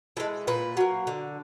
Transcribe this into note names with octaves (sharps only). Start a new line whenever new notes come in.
E3 G#3 A4
A#2 B4
F#3 A#3
D3